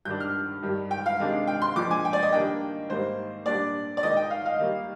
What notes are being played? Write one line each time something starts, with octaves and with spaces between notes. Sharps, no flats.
G2 D#3 G3 D4 G6
F6
G2 D#3 G3
G5
F5
C3 D#3 G#3 D4
G5
C6
A#2 F3 G#3 D4 D6
G#5
G5
D5
D#5
D#3 G3 A#3 D4 G5
G#2 D#3 G3 A#3 C5
A#2 G3 D4 D5
D5
D#3 G#3 D#4 D#5
G5
F5
F5
D#3 G3 A#3